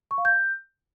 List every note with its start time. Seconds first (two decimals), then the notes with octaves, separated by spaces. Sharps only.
0.11 C#6
0.18 F5
0.25 G6